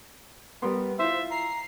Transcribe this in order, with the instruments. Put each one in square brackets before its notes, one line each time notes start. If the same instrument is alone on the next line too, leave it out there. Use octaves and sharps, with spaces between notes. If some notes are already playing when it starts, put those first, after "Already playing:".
[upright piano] G3 A#4 C6 [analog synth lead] B3
[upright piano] E4 F4 [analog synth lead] C5 [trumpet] E5
[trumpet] A#5 [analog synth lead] C7